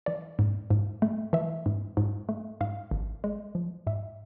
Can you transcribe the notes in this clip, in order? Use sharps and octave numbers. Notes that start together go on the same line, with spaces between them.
E3 D5
G#2
G#2
A3
E3 E5
G#2
G#2
A3
G#2 F5
G#1
G#3
F3
G#2 E5